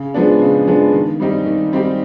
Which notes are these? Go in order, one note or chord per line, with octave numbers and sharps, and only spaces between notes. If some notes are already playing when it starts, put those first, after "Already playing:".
Already playing: C#3
F3 G#3 B3 D4
C#3
F3 G#3 B3 D4
D#3
G3 C4 D#4 G4
D#3
G3 C4 D#4 G4